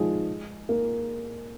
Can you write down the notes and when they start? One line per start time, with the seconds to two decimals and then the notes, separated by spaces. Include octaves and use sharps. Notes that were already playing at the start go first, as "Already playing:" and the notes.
Already playing: D#3 F3 G#3 F4 G#4
0.69 A#3 A#4